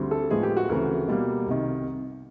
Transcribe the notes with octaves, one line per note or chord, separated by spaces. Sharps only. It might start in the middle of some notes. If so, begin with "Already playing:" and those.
Already playing: D2 D3 G3 C4
A4
A2 F3 G#3 B3 G#4
G4
F#4
D2 C#3 E3 A3 C4 A#4
B2 G3 A#3
C2 C3 D#3